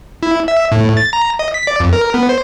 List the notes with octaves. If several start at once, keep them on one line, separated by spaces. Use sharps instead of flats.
E4
E5
A2
A6
A#5
D#5
B6
D5
F2
A#4
B3
C5